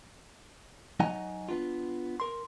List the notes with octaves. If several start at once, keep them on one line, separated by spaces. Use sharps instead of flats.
F#3 D#4 D#5 F#5 G#5 A#5
B3 D4 F4
A#4 C6